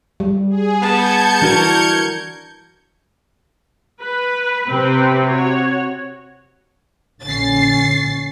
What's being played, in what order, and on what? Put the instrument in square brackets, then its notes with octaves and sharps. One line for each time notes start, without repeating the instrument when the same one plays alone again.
[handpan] G3
[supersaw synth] G#4
[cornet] B3 [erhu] A5 [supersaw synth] G6 G#6 C#7
[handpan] E3 D4 F#4 [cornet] A#4
[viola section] B4
[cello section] C3 [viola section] C4 G4 B4
[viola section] F#4 C#5
[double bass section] A#1 D3 C#4 [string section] A6 C7